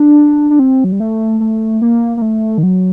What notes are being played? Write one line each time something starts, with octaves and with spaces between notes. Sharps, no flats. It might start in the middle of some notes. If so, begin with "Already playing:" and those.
Already playing: D4
D4
C4
F#3
G3
A3
A3
A#3
A#3
A3
D#3
F#3